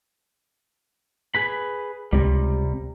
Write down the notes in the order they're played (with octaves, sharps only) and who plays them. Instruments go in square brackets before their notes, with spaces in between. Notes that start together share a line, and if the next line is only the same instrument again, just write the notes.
[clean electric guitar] G#4 B4 B5
[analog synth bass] C#2 [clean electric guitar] C3 G3